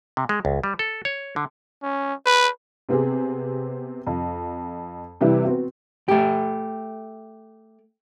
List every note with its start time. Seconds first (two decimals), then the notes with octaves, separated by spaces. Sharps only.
0.17 C3
0.29 G#3
0.45 C#2
0.64 G3
0.79 A4
1.05 C#5
1.36 D3
1.83 C#4
2.26 B4
2.89 C3 B3 C4 G4 G#4
4.07 F2
5.21 C3 E3 G3 E4 G4 B4
5.45 B3 C4 F#4
6.08 A3 G4